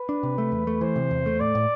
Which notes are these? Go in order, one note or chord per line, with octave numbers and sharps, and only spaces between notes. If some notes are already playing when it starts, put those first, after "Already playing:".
Already playing: B4
D4
C3
A3
E2
A3
E3 C5
C3
E2
A3
A2 D5
A2